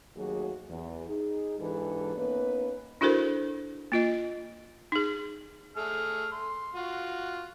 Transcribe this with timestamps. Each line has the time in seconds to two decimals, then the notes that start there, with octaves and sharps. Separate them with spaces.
0.16 D#2 F#3 A3 F#4 G#4
0.69 E2
1.07 D#4 G#4
1.59 G#2 E3 D4 G4 A4 B4
2.16 A#3 B3 C#4 D#4 B4
3.01 D4 E4 F#4 A4 A#4 C5
3.92 A#3 F4 D#5
4.92 D#4 G#4
5.76 A3 G#4 F6
6.32 C6
6.75 F4 F#4